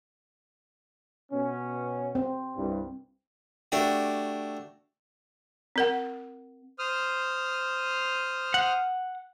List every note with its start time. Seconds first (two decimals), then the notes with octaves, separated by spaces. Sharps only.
1.32 B2 B3 C#4
2.15 C4
2.56 C2 G2
3.72 A3 D4 F#4 G4
5.76 C4 A#4 F#5
6.79 C5 D#6 F6
8.54 F#5